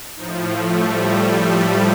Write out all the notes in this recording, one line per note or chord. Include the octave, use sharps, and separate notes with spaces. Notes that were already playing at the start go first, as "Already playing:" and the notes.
A2 F3 D#4
A3
G3
A3
G3